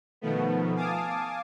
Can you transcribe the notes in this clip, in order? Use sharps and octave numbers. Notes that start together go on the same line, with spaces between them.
B2 D#3 F3 A3 B3
F5 G#5 A5 D6 D#6